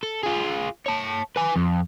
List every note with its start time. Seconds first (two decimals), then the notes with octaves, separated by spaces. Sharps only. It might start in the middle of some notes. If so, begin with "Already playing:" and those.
0.03 A4
0.23 F4 G#4
0.86 C#5 A5
1.36 B4 G#5
1.56 F2